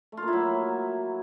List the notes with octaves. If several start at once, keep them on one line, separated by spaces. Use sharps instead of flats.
A3
F4
A#3
E4
F#3